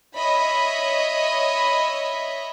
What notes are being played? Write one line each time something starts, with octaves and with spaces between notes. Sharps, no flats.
C#5 D#5 E5 B5